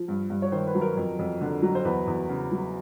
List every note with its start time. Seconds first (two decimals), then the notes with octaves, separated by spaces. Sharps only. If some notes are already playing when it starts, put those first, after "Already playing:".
Already playing: F3
0.08 G2
0.30 G2
0.42 C#5
0.52 D#3 C5
0.67 B4
0.75 F#3
0.81 A#4
0.97 F2
1.19 F2
1.41 D3
1.62 F#3
1.75 C5
1.85 E2 B4
2.07 E2
2.29 C#3
2.52 F#3